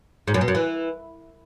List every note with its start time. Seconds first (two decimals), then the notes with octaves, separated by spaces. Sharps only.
0.27 G#2
0.34 F#2
0.41 B2
0.48 F#2
0.55 E3